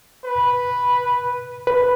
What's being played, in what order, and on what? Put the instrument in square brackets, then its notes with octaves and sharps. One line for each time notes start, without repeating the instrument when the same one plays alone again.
[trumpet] B4
[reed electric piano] B4